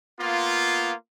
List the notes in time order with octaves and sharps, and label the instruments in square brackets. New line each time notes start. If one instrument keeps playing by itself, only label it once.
[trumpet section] A#3 B3 F4